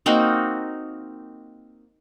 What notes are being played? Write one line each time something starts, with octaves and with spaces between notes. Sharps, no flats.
A#3 C4 D#4 F#4